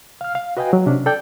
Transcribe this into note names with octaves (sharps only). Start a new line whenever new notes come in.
F5 F6
F5
F#4 B4 D#5 F5 G5 G#5
F#3
C3 C#4 D4
A4 D5 G5 G6